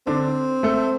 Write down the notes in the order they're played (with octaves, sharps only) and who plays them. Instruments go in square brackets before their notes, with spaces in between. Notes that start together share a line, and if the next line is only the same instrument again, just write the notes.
[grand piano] D3 D4 [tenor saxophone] C4
[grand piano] A3 A4